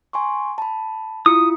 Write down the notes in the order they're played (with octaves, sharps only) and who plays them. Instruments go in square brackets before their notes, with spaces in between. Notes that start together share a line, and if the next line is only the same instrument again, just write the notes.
[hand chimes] G#5 C6 C#6
A5 B5
[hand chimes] E4 F4 C#7 [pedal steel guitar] D#6